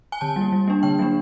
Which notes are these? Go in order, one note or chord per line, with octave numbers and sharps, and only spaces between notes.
G#5
D3 A5
G3
A#3
G3
A#3 D4
D3 G5
F#3 A#3 D4